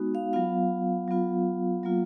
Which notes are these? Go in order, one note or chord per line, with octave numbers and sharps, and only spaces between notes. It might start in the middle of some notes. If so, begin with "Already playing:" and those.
Already playing: G#3 B3 D#4 F#4
F5
F#3 B3 F4 F5
F#3 B3 F4
F#3 A#3 F4